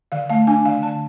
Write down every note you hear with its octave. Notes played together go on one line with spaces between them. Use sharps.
D3 F5
A3 F5
D4 G#5
D3 F5
D3 A5